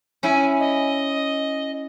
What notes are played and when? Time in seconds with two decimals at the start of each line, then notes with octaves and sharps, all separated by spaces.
0.23 C#4 E4 G#5
0.60 D#5